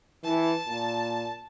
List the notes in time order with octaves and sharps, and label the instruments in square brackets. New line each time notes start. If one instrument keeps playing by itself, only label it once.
[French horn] E3 [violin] A5
[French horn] A#2